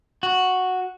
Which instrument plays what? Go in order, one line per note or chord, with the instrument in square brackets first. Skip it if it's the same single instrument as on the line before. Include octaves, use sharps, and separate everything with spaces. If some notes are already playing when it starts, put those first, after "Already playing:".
[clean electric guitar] F#4